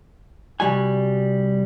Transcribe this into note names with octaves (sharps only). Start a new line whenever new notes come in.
C2 C#3 G3 F#4 G#5